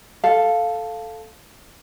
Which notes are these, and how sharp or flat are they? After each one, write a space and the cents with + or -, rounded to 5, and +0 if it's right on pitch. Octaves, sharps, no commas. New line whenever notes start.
A4 +0 F5 +0